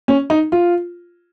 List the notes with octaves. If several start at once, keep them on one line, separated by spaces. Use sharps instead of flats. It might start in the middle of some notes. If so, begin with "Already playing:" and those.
C#4
D#4
F4